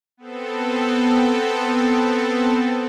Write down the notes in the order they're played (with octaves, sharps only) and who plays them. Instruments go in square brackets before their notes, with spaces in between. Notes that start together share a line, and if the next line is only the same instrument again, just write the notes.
[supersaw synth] B3 C4 A4